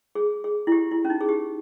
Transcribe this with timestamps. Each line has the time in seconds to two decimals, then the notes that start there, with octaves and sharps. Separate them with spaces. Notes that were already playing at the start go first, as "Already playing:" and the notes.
0.15 G#4
0.44 G#4
0.67 E4
0.72 G4
0.91 E4
1.05 C#4
1.10 D#4
1.21 G#4
1.29 G4